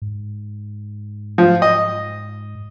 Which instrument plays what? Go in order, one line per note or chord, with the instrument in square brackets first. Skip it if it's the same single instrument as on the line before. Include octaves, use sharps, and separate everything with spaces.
[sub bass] G#2
[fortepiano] F3
D#5